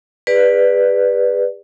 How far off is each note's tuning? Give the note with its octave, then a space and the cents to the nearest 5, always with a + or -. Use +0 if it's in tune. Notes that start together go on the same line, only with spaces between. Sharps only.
G#4 -45 B4 +0 D5 +10